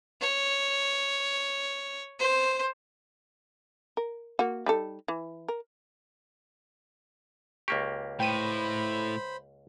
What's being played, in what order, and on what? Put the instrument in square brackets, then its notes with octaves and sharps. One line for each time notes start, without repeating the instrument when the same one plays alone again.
[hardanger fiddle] C#5
C5
[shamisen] A#4
A#3 F#4
G3 D#4 A4
E3
A#4
[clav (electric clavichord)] C#2 A#3 G4 [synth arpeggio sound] C#6
[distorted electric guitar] A2 [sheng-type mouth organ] C5 B5 [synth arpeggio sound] G5 D#7